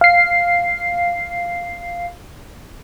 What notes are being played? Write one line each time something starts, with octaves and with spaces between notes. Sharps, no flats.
F5 C7